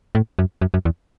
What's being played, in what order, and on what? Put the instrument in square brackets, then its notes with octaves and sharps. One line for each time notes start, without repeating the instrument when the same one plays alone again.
[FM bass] A2
F#2
F#2
F#2
E2